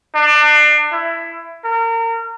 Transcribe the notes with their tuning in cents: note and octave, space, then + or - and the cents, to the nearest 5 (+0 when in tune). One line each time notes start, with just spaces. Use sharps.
D4 +30
E4 +15
A#4 -30